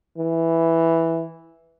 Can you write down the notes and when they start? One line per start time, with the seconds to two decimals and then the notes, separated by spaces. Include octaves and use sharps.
0.18 E3